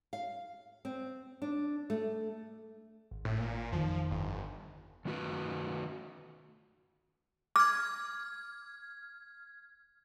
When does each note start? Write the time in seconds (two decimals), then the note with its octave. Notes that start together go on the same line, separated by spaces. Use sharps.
0.13 F5
0.85 C4
1.42 D4
1.90 A3
3.11 G#1
3.25 A2
3.39 A#2
3.72 F2 D#3 F3
4.11 G1
5.05 D#3 A3 F#4 B4
7.56 D6 F6 G#6